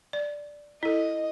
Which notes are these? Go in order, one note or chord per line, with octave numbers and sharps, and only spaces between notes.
D5
E4 A4 D#5